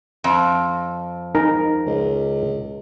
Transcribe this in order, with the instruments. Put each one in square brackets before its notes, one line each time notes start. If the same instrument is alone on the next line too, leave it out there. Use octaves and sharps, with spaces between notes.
[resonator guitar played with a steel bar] F2
[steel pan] D#4 [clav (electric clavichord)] A#4
[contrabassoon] C#2